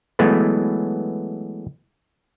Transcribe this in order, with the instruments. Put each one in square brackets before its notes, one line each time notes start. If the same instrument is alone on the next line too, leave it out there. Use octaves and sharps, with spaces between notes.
[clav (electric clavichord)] E3 F#3 G#3 A3 B3